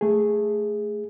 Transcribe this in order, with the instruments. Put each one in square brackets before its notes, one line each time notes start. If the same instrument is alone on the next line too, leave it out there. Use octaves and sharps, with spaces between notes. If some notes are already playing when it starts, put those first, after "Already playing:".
[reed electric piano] A3 G#4